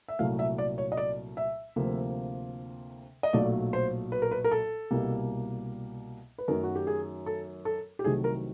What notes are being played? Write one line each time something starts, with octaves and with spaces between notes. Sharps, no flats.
E5
C2 A#2 F#3 A3 F5
E5
D5
C#5
D#5
D5
E5
D2 C3 F3 A#3
D#5
B1 A#2 F#3 A3 D5
C5
B4
A#4
B4
A#4
A4
C2 B2 G3 A#3
B4
F#2 D#3 F#3 A3 A#4
F#4
G4
G#4
A4
A4
G4
C2 C3 D#3 F#3 A3 G#4
A#4